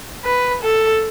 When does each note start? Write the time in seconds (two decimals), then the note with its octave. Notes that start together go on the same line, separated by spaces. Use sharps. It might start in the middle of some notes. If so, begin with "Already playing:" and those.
0.25 B4
0.63 A4